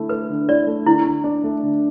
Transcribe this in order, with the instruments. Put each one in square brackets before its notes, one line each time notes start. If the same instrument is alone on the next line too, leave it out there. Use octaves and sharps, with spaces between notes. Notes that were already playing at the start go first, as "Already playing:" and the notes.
Already playing: [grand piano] D3 A3 E4
[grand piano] A4 [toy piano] B4
[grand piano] D3
[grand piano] E4 [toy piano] D5
[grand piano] A3
[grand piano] D3 [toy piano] E4
[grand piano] D3
D4
A3
D3